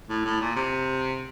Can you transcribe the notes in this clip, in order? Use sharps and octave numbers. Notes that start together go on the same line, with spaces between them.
A2
A2
A#2
C3